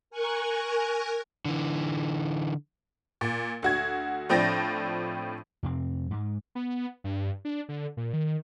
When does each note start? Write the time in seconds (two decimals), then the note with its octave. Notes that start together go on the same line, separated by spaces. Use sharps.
0.10 A#4 G#5 C#6 F#6 G#6
1.45 D3 E3
3.21 A#2
3.63 D2 F#4 G#6
4.29 A2 F3 C4 D4 A6 A#6
5.63 F2 C3 C4
6.11 G#2 G#3
6.55 B3
7.04 G2
7.45 D4
7.69 D3
7.97 A#2
8.13 D#3